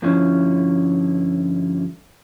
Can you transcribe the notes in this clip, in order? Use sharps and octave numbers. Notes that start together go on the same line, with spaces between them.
G2 D3 F3 C#4 E4